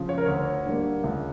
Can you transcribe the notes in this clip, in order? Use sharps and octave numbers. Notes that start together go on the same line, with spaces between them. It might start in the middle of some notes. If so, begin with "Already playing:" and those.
Already playing: C#3 F3
C#5
A#4
D2 C#5
D3 G3 A#3
C#2